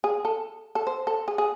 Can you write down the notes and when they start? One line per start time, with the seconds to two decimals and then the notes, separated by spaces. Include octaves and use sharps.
0.04 G#4
0.25 A4
0.75 A4
0.87 C5
1.07 A4
1.28 G#4
1.38 G#4